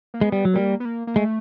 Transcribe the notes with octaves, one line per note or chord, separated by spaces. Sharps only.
A#3
G#3 B3
G3
F#3
G3 A#3
B3
A#3
A#3
G#3 A3